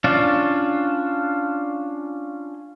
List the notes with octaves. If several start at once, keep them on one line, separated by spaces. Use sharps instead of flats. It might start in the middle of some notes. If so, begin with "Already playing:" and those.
C#4 D4 F4